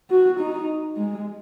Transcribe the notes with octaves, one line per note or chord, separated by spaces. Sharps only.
F#4
D#4
G#3